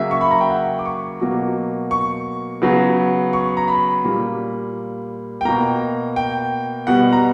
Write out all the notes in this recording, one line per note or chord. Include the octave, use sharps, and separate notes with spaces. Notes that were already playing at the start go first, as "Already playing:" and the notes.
Already playing: C#3 F#3 A#3 E5
C#6
B5
A#5
G5
F#5
D6
C#6
B2 F#3 A#3
C#6
C#3 F#3 B3
C#6
A#5
B5
A#2 G3 A#3
G5
B2 A#3 A#5
G5
B2 G3 B3 F#5
A#5